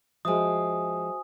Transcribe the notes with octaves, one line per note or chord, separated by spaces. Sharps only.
F3 G#3 F#4 C5 E5 G#5 D#6